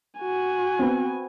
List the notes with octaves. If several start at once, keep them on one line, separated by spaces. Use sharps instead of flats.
F#4 G#5
B3 C4